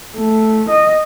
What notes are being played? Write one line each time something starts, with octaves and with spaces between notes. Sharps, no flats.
A3
D#5